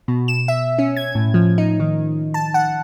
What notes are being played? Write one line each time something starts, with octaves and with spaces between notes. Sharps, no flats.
B2
E7
E5
C#4
G#6
A2
F3
D#4
D#3
A5
F#5